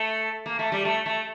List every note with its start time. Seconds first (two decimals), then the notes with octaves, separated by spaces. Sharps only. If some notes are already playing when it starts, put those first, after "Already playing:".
Already playing: A3
0.46 A#3
0.59 A3
0.72 G3
0.85 A3
1.06 A3